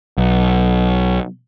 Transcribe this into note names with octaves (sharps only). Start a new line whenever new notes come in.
B1